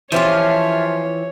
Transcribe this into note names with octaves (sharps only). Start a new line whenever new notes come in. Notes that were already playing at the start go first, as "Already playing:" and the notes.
E3 F3 C#4 F4 G4 C#5 E5